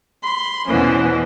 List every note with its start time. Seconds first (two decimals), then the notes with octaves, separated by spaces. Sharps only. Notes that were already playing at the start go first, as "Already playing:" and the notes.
0.23 B5 C6
0.66 E2 B2 E3 F3 C#4